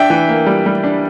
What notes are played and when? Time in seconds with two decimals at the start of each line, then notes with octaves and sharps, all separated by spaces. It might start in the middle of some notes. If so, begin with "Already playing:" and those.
Already playing: D4 E5 G5
0.10 E3
0.29 A#3
0.47 G3
0.66 G3
0.84 D4